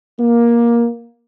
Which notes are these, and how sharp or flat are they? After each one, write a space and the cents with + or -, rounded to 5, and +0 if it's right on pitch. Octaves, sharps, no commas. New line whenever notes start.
A#3 +15